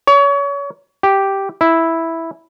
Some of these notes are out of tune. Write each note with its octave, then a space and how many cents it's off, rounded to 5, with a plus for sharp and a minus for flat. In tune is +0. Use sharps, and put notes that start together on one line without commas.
C#5 +30
G4 -5
E4 -5